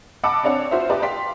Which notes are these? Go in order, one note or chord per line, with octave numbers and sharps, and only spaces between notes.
D#5 F#5 A5 B5 D6 E6
C4 D4 C#5 D5 F#5
F4 F#4 C5 E5
G4 B4 D5 D#5 G5 A5
D5 F5 G5 C6 B6